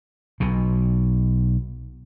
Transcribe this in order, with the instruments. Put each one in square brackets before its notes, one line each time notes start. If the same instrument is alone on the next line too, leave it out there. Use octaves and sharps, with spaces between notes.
[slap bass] B1 B2